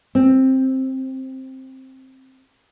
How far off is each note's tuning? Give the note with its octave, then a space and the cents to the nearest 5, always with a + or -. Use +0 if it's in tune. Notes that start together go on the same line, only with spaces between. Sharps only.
C4 +10